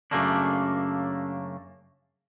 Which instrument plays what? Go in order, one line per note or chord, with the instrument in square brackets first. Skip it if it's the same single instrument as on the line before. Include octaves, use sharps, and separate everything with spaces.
[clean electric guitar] F#2 C#3 A3 A#3 D4